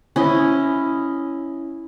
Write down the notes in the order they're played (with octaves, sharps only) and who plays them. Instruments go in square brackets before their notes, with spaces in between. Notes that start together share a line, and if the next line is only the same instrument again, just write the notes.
[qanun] C#4 E4 D#5